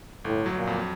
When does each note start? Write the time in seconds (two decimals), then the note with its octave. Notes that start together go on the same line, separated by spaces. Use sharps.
0.24 G1 A2
0.46 F#3
0.56 A#2
0.67 F2